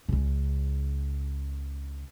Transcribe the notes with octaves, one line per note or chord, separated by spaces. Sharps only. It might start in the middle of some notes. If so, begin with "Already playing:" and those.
C#2 C#3